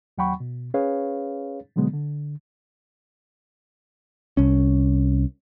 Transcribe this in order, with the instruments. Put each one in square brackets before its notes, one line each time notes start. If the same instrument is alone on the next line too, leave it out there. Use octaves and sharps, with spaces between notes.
[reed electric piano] D#2 F#3 F#5 G5 B5 C#6
B2
C#4 G#4 B4 C#5 F5
B2 D3 F#3 G#3 B3
D3
[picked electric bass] C2 C#4